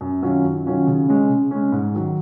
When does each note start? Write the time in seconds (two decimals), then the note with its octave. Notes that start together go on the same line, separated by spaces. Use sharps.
0.01 F#2
0.22 D#3 F#3 C#4 F4
0.44 F#2
0.65 D#3 F#3 C#4 F4
0.87 C#3
1.09 G#3 C#4
1.29 C#3
1.51 G#3 C#4
1.72 G#2
1.94 D#3 F#3